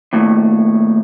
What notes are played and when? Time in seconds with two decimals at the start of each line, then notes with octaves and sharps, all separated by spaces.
0.13 D#2 A2